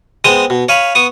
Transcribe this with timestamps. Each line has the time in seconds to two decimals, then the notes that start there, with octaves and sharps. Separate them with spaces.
0.25 G#3 B3 C4 C6 D#6
0.50 B2
0.69 C#5 F5 G#5 B5
0.95 B3 C#6 D#6